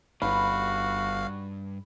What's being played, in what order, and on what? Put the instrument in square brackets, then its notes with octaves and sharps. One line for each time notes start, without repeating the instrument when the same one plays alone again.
[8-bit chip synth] G1 F5 [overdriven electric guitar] G2 [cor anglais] F#4 [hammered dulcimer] B5